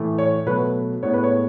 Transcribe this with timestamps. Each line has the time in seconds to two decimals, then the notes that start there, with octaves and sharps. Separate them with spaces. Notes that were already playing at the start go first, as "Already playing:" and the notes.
Already playing: A2 E3 A3
0.18 C#5
0.46 B2 F#3 A3 B4
1.03 A2 G#3 B3 C#5
1.14 B4
1.24 C#5